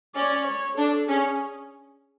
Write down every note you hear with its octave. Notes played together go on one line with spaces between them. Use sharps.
C#4 D5
C#5
D4 A4
C#4 G#4